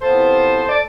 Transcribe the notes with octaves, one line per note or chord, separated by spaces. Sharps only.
C3 E3 B3 F4 A4 C5
D5